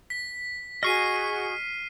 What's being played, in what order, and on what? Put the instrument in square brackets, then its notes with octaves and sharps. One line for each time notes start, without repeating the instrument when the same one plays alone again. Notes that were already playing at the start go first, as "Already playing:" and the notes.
[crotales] B6
[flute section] F#4 G#4 [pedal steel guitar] D#5 C#6 [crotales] F6 C7 D#7